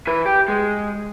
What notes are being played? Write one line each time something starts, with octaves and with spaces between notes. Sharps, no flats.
E3 B4
G4
G#3